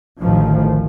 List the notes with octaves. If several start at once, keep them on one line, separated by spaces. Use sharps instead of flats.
A1 D2 D#3 F3